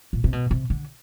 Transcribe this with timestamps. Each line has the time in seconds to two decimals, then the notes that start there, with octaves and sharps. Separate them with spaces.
0.13 A#2
0.24 C3
0.33 B2
0.51 C3
0.70 D3